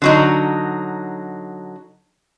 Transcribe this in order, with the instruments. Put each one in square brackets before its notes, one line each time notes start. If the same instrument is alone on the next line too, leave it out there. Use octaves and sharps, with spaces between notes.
[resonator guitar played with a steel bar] D3 F#3 D#4